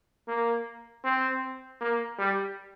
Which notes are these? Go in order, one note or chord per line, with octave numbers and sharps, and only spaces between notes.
A#3
C4
A#3
G3